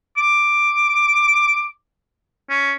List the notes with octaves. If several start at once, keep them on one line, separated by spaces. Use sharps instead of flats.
D6
C#4